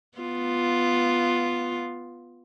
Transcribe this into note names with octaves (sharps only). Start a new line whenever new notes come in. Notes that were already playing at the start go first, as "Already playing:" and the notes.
B3 F4